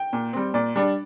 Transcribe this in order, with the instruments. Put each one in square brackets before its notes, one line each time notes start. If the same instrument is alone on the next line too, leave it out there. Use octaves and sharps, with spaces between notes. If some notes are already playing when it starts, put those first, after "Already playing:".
Already playing: [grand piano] G5
[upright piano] A#2
G3 C4
[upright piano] A#2 [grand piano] D5
[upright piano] G3 D4